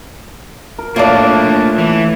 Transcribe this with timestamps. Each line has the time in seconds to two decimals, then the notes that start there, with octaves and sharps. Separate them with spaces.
0.79 A#4
0.96 A2 A#3 D4 F4 A4 D5 A5
1.78 E3